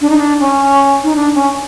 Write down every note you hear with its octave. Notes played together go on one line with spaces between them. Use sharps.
D4
D#4
D4
C#4
D#4
D4
C#4